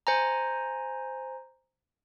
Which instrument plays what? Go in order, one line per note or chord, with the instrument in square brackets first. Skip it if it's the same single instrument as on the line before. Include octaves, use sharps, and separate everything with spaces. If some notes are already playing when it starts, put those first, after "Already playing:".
[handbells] C5 G#5 A#5